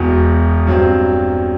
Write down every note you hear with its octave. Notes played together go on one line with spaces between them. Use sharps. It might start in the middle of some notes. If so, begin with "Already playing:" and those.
Already playing: E1 E2 B2
G2 F#3 C4